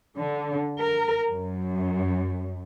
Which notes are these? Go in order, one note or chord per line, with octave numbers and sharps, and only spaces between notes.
D3
A#4
F#2